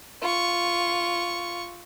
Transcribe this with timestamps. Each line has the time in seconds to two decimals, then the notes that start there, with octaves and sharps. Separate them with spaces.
0.22 F4 C#6